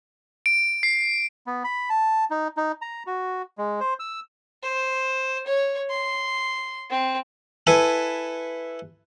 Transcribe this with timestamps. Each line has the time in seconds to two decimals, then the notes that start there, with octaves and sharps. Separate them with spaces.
0.46 D7
0.83 C7
1.47 B3
1.64 B5
1.90 A5
2.30 D#4
2.57 D#4
2.82 A#5
3.07 F#4
3.58 G#3
3.80 C5
3.99 E6
4.63 C5
5.46 C#5
5.89 C6
6.90 C4
7.67 E4 A4 B4 G#5 A5